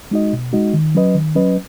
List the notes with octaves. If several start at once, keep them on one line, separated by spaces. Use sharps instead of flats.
G#3 D#4 F#4 D#5
B2
G#3 D#4 F#4 D#5
D#3
F#3 C#4 B4 D#5
D#3
F#3 C#4 B4 D#5